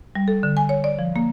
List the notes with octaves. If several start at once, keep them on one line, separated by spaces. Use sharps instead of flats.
G3
A4
D3
G#5
C#5
D5
F3
A#3